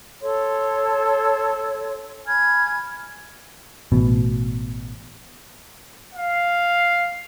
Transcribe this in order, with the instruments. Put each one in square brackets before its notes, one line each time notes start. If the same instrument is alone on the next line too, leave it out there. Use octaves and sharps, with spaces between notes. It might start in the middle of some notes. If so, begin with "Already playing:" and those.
[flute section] A4 C#5 C6
G#5 B5 F6 G#6
[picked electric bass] A1 B2
[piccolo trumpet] F5